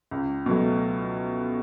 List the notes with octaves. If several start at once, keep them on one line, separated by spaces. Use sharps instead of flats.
C#2
B2 F#3 A3